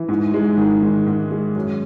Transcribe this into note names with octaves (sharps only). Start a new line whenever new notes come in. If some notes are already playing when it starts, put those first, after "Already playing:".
Already playing: E3
G#2
G#3
D#3
G#2
G#2
G#3
F#2